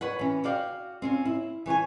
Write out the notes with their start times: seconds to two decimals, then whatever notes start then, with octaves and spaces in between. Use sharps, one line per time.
0.01 B4 C#5 F#5
0.19 E3 C#4
0.44 F#4 D5 F5 G5
1.02 C4 C#4 F4
1.25 E4
1.66 E3 C#5 F#5 G#5